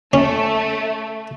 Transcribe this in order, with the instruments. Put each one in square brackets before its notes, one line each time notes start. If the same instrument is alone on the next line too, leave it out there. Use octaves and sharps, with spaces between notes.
[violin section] A3 [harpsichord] C#4